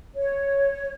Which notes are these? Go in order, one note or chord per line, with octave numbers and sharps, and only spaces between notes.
C#5